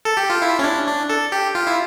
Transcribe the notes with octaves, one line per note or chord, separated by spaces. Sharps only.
A4
G4
F4
E4
C#4
D4
D4
A4
G4
F4
E4